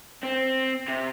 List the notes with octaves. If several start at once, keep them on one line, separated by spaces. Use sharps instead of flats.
C4
C3